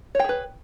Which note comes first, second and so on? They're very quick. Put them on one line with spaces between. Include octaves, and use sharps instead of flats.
C#5 G5 G#4 B4